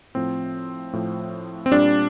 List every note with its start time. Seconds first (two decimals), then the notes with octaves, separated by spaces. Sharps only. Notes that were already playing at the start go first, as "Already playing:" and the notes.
0.15 A2 F3 C4
0.93 A2 F3
1.66 C4
1.71 A#2 G3 D4